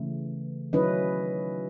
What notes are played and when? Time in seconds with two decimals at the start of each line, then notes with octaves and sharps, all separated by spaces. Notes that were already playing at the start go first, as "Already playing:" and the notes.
Already playing: C#3 E3 A3
0.73 D#3 F#3 C#4 E4 B4 D#5